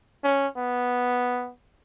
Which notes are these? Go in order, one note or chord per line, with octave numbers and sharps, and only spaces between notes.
C#4
B3